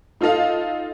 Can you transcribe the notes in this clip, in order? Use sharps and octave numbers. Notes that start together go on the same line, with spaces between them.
D#4 F4 A4 D#5 F5